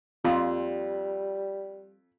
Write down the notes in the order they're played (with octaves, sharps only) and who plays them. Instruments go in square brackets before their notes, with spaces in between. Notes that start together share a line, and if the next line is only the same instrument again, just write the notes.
[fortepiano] F2 [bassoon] G3 [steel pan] F4